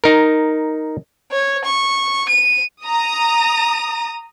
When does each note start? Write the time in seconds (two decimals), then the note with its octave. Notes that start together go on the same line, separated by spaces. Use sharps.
0.04 D#4 A#4
1.32 C#5
1.65 C#6
2.29 D#7
2.83 A#5 D#6